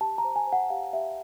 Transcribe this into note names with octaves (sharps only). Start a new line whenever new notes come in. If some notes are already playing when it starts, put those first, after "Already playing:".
G4 A5
A#5
C5
G#5
C5
F#5
G4 F5
G4 E5